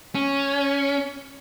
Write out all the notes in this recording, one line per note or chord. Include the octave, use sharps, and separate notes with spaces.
C#4